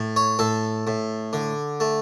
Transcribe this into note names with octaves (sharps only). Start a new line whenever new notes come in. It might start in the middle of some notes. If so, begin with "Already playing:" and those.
Already playing: A2
C#5
A2 A4
A2
D3
A3